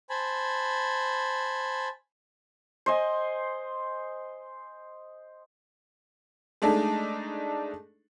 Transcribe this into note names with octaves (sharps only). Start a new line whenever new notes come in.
C5 G#5 A5 B5
C5 D#5 G#5
G#3 A3 D4 D#4 A4